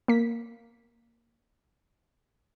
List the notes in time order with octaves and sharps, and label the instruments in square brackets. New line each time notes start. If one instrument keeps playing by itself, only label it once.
[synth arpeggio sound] A#3 B6